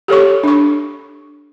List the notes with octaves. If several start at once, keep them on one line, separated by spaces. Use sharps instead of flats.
G4 A4 C#5 C#6
D4 C#6